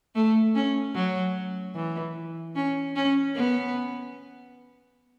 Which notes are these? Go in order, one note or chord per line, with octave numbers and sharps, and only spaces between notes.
A3
C#4
F#3
E3
C#4
C#4
B3